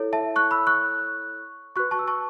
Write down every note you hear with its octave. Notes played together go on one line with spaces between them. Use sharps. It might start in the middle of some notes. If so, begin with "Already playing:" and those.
Already playing: E4 A4 C#5
E5 A5
C#6 F#6
B5 E6
C#6 F#6
F#4 B4 C#6 F#6
A5 C#6
E6
A5 C#6